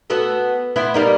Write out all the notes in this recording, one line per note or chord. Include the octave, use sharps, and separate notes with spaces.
B3 F#4 A4
B3 C4 E4
G3 A#3 D#4